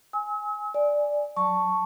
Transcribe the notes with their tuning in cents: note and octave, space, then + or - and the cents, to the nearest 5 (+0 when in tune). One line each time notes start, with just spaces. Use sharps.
G#5 +0 E6 -45
D5 +0 G#5 +0
F#3 -5 A5 +0 C#6 +0